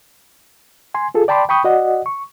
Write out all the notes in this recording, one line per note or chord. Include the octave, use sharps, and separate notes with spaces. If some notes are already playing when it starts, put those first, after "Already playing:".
G#5 C6
F4 G#4 A4
D5 G5 A5 B5 C6 D6
G5 B5 C#6 D#6 G6
F#4 D5 D#5 F#5
C#6